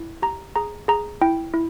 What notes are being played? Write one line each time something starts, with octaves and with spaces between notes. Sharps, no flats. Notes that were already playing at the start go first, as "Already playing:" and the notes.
Already playing: E4
G4 A#5
G#4 A#5
G#4 A#5
E4 G5
E4